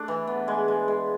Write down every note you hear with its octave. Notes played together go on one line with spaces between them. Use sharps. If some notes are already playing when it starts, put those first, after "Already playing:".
Already playing: A3 D4
E3
B3
G#3
G#3
G#3